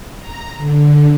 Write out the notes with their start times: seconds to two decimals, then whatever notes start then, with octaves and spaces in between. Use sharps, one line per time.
0.20 A#5
0.57 D3